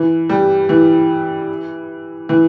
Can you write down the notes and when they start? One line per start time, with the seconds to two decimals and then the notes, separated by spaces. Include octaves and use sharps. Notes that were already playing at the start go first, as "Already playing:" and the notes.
Already playing: E3
0.29 G3
0.69 E3
2.29 E3